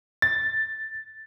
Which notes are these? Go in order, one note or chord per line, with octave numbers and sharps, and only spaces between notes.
A6